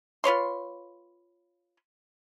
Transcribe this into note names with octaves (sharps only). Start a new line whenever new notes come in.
F4 B4 C#5 C6